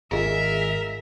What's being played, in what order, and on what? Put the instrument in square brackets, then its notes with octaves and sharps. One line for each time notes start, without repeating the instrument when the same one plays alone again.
[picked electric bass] G#1 [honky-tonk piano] F4 G#4 D#5 [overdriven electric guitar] A#4 [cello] E5